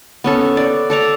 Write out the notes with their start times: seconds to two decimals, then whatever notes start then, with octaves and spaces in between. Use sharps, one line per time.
0.24 B3 C#4 A4
0.57 D5
0.90 A4 D5 A#5